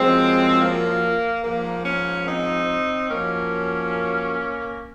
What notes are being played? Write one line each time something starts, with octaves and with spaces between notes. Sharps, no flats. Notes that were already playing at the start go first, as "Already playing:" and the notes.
Already playing: F#2 F3 G#3 C4
A#3
G#2 F3 A#3
A#3 C#4
C4 D#4
F#2 F3 A#3 C#4